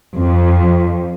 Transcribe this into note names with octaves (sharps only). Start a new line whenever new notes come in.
F2